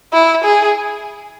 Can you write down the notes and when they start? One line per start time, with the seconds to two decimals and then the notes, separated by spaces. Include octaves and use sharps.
0.13 E4
0.45 G#4